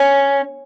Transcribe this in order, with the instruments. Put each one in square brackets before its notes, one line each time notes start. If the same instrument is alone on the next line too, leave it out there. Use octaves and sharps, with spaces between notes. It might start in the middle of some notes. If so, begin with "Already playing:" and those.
Already playing: [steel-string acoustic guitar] C#4